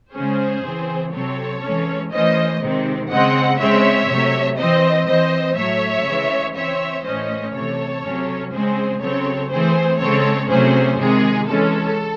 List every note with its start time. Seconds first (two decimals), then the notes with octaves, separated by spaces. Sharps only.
0.14 C#3 G#3 C#4 G#4 C5
0.64 C#3 E3 C4
1.13 C3 F#3 C4 A4 C#5
1.62 E3 G#3 C#4
2.12 E3 A3 C#4 C5 D#5
2.61 C3 D#3 G#3 C4
3.10 C#3 G#3 C4 D#5 F#5
3.59 C#3 G#3 C4 C#5 E5
4.09 C3 F#3 A3
4.58 E3 C4 C5 D#5
5.07 E3 C4 C5 D#5
5.56 A2 F#3 A3 C#5 E5
6.05 C#3 E3 G#3
6.55 E3 C4 C#5 E5
7.04 A2 E3 A3 C#4 C5 D#5
7.54 C3 E3 A3 A4 C#5
8.03 C3 F#3 C#4
8.52 C#3 G#3 C4 G#4 C5
9.01 C#3 F#3 C4 A4 C#5
9.51 E3 A3 C4 G#4 C5
10.00 C#3 G#3 C4 A4 C#5
10.49 C3 F#3 A3 C#4 G#4 C5
10.99 C3 D#3 G#3 G#4
11.48 E3 G#3 C#4 A4